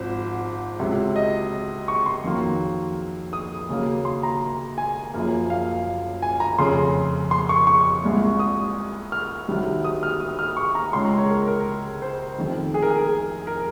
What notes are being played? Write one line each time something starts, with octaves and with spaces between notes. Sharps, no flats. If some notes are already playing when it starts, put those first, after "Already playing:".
Already playing: G#1 G#2 F3 C5
C#2 C3 F#3
D#5
C#6
C6
F2 D#3 F#3 A#3
D#6
D#2 C#3 F#3 A#3
C6
A#5
G#5
F#1 F#2 F3 A#3
F5
G#5
A#5
F1 F2 C#3 C6
C6
C#6
C#6
C2 A#2 G#3
D#6
F6
C2 C3 D#3 F#3
D#6
F6
D#6
F6
C#6
A#5
C#2 C#3 G#3 C6
A#5
C#5
A#4
A#4
C5
F1 F2 D#3
G#4
A#4
G#4
A#4